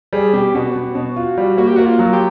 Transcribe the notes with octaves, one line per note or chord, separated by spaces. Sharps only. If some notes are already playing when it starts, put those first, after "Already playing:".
G3 G#4
B2 G4
B2 F#4
B2
B2
F4
G3
A#3 F#4
G4
A#3 F#4
F4
F#3
G4